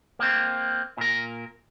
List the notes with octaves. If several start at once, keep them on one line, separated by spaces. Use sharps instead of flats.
A#3 C4
A#2 A#4